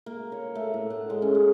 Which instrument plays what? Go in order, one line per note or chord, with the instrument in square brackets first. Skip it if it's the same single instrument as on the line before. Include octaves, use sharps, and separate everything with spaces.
[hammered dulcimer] A#3
C#5
A3
A2
F#5
G#3
C#4
A#3